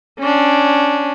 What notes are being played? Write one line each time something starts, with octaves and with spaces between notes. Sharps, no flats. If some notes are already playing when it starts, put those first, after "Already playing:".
C#4 D4